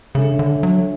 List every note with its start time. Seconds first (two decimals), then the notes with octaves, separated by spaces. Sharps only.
0.14 C#3 G#3 D4 A4 C#5 E5
0.39 D3
0.63 F#3